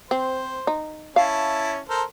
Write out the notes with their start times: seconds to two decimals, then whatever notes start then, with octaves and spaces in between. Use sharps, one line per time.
0.11 C4 C5
0.67 D#4
1.16 C#4 E4 F5 A5
1.89 A4 A#4 C5